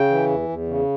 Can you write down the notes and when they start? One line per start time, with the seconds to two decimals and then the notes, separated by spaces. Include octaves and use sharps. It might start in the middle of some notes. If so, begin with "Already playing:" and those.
Already playing: C#3 G5
0.10 E3
0.29 E2
0.49 E2
0.68 C#3